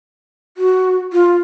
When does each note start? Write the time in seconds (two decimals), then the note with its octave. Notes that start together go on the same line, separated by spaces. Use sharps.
0.57 F#4
1.13 F4